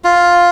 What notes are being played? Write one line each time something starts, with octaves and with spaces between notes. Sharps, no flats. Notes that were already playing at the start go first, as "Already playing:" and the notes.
F4